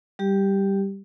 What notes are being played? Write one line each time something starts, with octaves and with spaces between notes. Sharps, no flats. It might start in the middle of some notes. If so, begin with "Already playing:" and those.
G3 G4